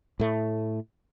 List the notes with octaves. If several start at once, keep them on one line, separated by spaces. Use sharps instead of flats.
A2 A3